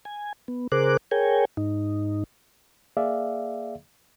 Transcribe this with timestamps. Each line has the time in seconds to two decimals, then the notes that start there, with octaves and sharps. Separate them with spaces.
0.05 G#5
0.48 B3
0.72 C#3 G#4 A#4 C5 D6 F#6
1.11 G#4 A#4 C#5 G5 G#5
1.57 G#2 D#4
2.97 A#3 G#4 D5 E5 F5